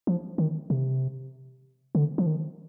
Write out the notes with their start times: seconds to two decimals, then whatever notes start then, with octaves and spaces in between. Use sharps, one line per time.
0.07 F3
0.38 D#3
0.70 C3
1.95 D3
2.18 F3
2.26 D#3